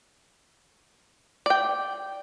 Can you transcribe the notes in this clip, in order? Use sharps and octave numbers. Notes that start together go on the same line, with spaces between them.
D5 G5